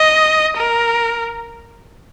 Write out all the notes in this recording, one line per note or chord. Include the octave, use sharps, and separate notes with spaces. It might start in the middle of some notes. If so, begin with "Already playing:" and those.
Already playing: D#5
A#4